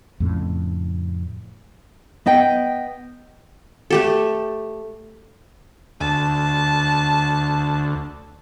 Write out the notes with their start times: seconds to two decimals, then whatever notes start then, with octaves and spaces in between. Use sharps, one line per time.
0.20 F2 A2 C#3
2.26 B3 D#5 G5
3.90 A3 G4 A4
6.00 D2 A5